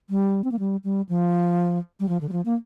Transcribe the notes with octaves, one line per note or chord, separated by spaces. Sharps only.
G3
C4
A#3
G3
G3
F3
G3
F3
D3
G3
F3
A#3